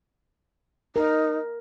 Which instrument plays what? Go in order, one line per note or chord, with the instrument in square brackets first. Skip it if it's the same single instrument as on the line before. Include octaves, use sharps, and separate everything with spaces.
[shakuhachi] D#4 [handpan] A#4